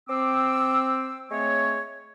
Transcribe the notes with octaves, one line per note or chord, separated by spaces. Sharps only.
C4 D6 E6
G#3 A3 C4 C#5